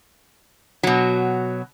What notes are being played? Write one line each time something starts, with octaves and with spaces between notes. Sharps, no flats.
B2 F#3